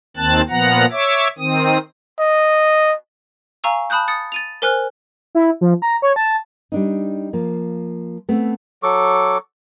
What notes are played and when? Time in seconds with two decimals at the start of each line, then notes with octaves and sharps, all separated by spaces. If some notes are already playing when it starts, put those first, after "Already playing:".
0.17 D#2 D#3 C4 A5 F#6 A6
0.49 A#2 F3 B3 F#5 A#5
0.91 C#5 E5 D6
1.38 D#3 C4 D#6
2.19 D#5
3.64 F5 G#5 A#5 C#6 E6
3.90 A5 B5 D#6 F#6 G6
4.08 D#6 A6 C#7
4.32 A6 D#7 F7
4.62 A#4 C5 G#5 F6 F#6
5.35 E4
5.61 F3
5.82 A#5
6.02 C#5
6.16 A5
6.72 G3 D4 D#4
7.33 F3 A#3
8.29 A3 B3 C4
8.83 F#3 A4 C#6 D6